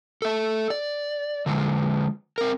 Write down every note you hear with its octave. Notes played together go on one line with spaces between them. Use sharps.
A4 E5
D5
D3 F3 G#3
C4 A#4